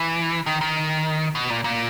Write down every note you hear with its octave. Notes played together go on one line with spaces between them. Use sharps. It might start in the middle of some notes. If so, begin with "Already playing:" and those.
Already playing: E3
D#3
D#3
B2
A#2
A#2